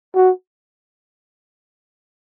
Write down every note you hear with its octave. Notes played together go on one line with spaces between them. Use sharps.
F#4